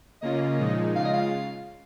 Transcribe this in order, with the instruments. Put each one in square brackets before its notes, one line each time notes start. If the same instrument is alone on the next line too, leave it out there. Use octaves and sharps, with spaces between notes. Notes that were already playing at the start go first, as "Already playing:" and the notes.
[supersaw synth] C#3 A#3 C#4 F4 [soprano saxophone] D#5
[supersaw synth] A#2 F3 G#3 D#4
[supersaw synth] C#3 G#3 F4 [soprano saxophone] F5
[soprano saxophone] D#5
F5